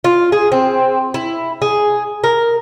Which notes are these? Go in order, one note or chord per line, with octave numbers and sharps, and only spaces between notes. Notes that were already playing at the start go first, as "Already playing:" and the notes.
F4
G#4
C4
E4
G#4
A#4